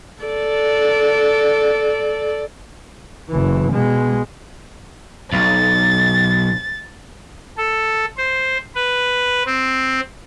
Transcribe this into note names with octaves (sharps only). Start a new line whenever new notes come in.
A4 D5
F#1 E3
B2 G#3
B1 A6
A4
C5
B4
C4